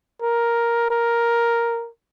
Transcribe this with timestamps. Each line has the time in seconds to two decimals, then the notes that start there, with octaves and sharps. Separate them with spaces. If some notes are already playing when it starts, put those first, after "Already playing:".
0.22 A#4
0.90 A#4